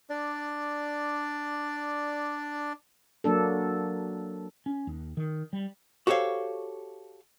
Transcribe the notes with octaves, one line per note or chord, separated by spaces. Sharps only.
D4 D5
F#3 A#3 D4 A4
C#4
D#2
D#3
G3
F#4 G4 A4 C5 C#5 F5